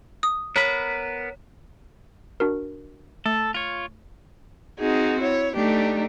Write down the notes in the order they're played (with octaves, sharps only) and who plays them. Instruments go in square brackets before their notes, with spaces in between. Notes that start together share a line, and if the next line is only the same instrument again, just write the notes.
[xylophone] D#6
[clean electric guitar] B3 A#4 B5 [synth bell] C#5
[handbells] D4 F#4 A#4
[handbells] A3 [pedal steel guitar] A4
[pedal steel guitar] F4 C#5
[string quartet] C4 D#4 F#4 G#4
E4 C#5
A3 D4 D#4 G4